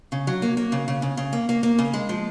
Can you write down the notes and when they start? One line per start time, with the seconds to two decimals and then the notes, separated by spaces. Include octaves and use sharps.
0.12 C#3
0.27 F#3
0.42 A#3
0.57 A#3
0.72 C#3
0.88 C#3
1.02 C#3
1.17 C#3
1.33 A#3
1.49 A#3
1.63 A#3
1.78 C#3
1.93 G#3
2.09 F3